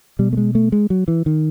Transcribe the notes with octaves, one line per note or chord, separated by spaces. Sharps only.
B2 G3
A3
G#3
A3
G#3
F#3
E3
D#3